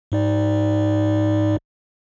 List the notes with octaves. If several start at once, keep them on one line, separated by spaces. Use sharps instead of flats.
G#2 D#4 D5